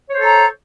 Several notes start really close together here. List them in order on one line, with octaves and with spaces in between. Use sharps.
C#5 C5 A4 A#5